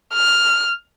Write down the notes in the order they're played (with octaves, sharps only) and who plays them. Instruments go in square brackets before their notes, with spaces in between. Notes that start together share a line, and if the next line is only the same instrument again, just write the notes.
[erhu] F6